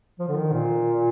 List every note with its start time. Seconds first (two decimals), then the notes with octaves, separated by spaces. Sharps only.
0.19 F3
0.28 D3
0.35 D#3
0.53 A#2